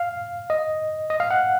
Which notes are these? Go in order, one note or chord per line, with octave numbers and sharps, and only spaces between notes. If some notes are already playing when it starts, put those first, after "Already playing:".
Already playing: F5
D#5
D#5
F5
F#5